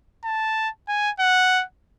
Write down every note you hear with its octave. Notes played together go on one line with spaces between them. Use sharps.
A5
G#5
F#5